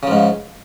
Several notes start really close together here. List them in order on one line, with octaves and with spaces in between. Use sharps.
C#3 F3 G#2